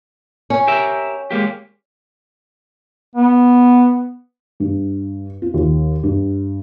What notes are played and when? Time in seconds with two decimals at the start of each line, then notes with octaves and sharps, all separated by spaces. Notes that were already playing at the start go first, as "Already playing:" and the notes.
0.50 C#4
0.67 G4 A#4 E5
1.31 G#3 A#3 G4
3.15 B3
4.60 G2
5.42 F4
5.54 D#2
6.03 G2